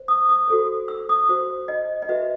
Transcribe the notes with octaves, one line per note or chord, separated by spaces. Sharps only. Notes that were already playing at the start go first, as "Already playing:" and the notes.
Already playing: C5
D#6
D#6
F#4 A4 C5
E6
D#6
F#4 C5
D#5
D#5
F#4 B4 E5